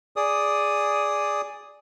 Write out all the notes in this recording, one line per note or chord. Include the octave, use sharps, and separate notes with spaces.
G#4 D5 D#6